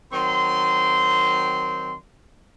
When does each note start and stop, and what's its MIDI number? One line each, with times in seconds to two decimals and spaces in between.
0.13 1.95 51
0.13 1.95 54
0.13 1.95 60
0.13 1.95 84